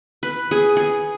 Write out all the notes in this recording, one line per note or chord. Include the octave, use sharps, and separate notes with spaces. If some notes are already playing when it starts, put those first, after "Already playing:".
B4
G#4
G#4